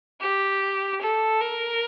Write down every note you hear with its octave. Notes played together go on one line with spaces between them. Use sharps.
G4
A4
A#4